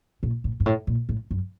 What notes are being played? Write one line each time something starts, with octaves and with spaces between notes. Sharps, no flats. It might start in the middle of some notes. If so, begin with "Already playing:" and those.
A#2
A2
G#2
A2
A#2
A2
F#2